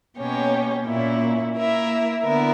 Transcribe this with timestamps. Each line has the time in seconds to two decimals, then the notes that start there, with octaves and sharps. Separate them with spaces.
0.17 B2 A#3 C#4 G4 C#5
0.85 A#2 A#3 C#4 E4
1.55 A#3 E4 A#4 E5
2.23 D3 B3 E4 A#4